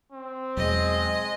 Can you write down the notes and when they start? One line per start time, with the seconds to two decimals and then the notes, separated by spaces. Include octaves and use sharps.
0.12 C4
0.57 E2 B2 F#3 G#3 D#5